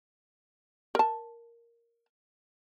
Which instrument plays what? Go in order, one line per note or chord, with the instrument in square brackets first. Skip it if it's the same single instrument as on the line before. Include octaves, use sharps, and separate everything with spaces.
[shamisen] A#4 A5